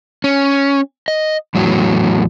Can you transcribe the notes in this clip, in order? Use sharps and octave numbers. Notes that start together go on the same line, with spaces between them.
C#4
D#5
E2 A2 F#3